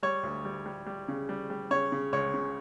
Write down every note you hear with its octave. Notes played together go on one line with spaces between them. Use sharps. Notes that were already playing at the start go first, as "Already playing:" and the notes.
G3 C#5
D2
G3
G3
G3
C#3
G3
G3
C#3 C#5
C#3
C#2 C#5
C#3